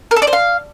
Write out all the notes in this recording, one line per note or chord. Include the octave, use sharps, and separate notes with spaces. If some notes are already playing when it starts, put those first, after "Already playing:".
A#4
A4
D5
C5
F5